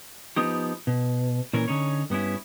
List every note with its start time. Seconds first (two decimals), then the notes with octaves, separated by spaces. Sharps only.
0.36 F3 B3 D#4 G4
0.87 B2
1.53 A#2 E3 C#4 A#4
1.68 D3 C#4 D#4 C#5
2.10 G2 B3 C#4 E4